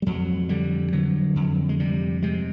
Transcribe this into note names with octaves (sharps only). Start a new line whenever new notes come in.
G3
F2 F#3
D3 G3
D3 F#3
F2
G#3
C3 G3
C3 G#3